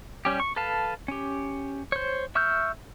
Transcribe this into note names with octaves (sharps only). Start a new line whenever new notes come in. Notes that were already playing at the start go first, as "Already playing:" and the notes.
G3 C#4 G4
C#6
A4 B4 F5 A5
C#4 G4
C5 C#5
E5 C#6 E6 F6 G6